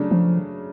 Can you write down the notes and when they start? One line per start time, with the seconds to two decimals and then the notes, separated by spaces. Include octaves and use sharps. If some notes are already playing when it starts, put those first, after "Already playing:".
Already playing: C#3 F#3 A3 D4
0.11 F3